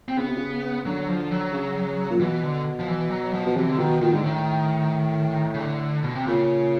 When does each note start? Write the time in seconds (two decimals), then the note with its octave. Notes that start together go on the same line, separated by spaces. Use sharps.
0.09 C4
0.17 C#3 B3
0.28 C3
0.38 C#3
0.86 D3 F#3
1.08 F3
1.31 F#3
1.52 C#3
2.11 A#2
2.20 B2 E3
2.43 D3
2.79 F3
2.88 E3
3.11 F#3
3.34 F3
3.46 B2
3.56 C3 E3
3.69 D3
3.79 B2 D#3
4.01 A#2 D#3
4.14 G#2 D3
4.24 A2 D#3
5.54 C#3
5.60 D3
6.03 B2
6.15 C3
6.27 A#2 C#3